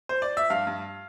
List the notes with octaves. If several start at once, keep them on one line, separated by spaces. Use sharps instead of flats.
C5
D5
E5
G2 F5
G2